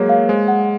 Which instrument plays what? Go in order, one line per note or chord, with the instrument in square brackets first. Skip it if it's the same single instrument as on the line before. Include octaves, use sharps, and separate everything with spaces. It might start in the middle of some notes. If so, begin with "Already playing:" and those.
Already playing: [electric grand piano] F#3 G#3 A#3 [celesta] G#4 C#5
[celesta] F5
[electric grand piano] G#3 [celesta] C5
[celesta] F#5